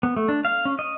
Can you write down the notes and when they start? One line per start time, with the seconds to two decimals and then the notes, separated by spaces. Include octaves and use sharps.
0.03 B3
0.16 A3
0.29 D4
0.45 F5
0.65 C#4
0.79 D#5